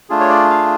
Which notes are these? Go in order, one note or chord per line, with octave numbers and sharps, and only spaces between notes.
A3 D4 F4 G#4
C#5
D5
F5